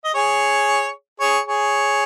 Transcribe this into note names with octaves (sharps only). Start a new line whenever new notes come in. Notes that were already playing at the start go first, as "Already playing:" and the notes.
D#5
G#4 C#5
G#4 C#5
G#4 C#5